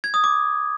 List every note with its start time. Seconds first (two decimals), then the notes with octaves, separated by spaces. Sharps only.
0.04 G#6
0.14 D#6
0.24 D6